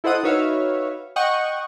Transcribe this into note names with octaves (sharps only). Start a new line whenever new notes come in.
E4 A4 C5 D#5 F#5 D#6
D#4 F#4 B4 C#5 E5 F5
D#5 F#5 G5 C#6